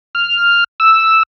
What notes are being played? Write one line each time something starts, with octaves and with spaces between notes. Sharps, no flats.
F6
E6